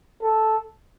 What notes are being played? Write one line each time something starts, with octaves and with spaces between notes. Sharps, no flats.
A4